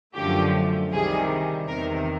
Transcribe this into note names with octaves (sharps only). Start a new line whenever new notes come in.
F#2 D3 F3 A3 G4
C2 C3 D#3 G3 G#4
E2 C3 D#3 A#4